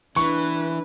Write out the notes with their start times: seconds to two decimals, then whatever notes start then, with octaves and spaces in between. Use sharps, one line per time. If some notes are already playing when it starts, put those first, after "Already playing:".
0.16 E3 D4 B4 C#6